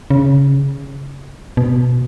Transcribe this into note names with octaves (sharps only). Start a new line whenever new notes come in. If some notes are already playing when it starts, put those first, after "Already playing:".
C#3
B2